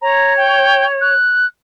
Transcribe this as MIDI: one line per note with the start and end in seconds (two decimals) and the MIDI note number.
0.01 1.13 73
0.01 0.36 82
0.37 0.85 79
1.01 1.46 90